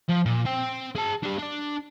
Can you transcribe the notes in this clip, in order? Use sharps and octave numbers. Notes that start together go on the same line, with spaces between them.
F3
A#2
C4 G5
G#4 A5
D4 G4
D4 D5